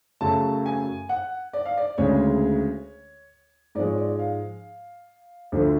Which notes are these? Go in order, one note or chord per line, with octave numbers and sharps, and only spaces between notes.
F#2 C#3 F#3 A3 A5
G#5
F#5
D5
F5
D5
D2 C#3 G#3 C#5
G#2 F3 G#3 D5
C#5
D5
D5
F5
D2 D3 F3 A3